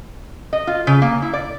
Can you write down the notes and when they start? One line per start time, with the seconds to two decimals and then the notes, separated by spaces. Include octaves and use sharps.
0.53 D#5
0.67 F4
0.87 C#3
1.02 A#3
1.22 E4
1.33 D5